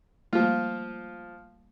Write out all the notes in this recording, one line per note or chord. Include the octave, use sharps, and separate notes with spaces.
F3 G3 A3 A#3 F4